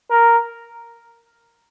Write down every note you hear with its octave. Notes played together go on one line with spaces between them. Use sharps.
A#4